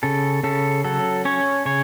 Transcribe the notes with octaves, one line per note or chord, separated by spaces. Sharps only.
C#3 A4
C#3 A4
F#3 A4
C#4 C#5
C#3 C#5